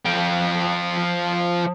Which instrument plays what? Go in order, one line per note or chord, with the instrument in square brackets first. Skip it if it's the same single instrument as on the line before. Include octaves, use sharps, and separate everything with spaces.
[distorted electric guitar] F3 G5